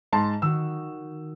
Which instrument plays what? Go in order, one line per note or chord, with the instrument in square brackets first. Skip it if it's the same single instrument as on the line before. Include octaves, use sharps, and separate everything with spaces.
[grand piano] G#2 A5 C6
[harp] D#3 F#4 [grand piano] E6